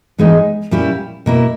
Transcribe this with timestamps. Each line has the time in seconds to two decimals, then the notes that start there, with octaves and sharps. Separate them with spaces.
0.18 G#2 E3 G#3 B3 D#4
0.71 A#2 G3 C#4 E4 G4
1.26 B2 A#3 E4